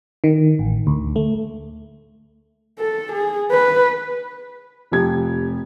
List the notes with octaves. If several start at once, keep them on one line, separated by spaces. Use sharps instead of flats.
D#3
A1
D2
A3
A4
G#4
B4
F1 F3 G4 G#6